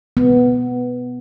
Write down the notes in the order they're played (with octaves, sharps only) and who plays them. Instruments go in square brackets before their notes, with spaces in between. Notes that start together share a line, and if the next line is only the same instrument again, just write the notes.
[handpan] B3